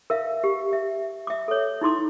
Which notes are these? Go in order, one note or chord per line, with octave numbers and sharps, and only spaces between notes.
A#4 E5 F5
G4
E5
E5 D6
A4 C#5
D#4 E4 C6 D6